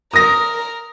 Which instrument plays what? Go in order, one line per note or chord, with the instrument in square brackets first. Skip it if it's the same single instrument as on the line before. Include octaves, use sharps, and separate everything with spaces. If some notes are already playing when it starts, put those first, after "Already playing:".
[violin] A#4 [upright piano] D#6 A#6